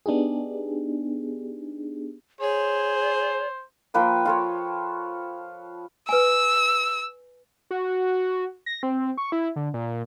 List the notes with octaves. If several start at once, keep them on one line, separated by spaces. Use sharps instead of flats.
B3 D4 D#4 G4 G#4
G#4 C5 C#5
F3 A#3 B4 G5
F4 A4 C#5
B4 G#5 E6
F#4
A#6
C4
C#6
E4
D3
A#2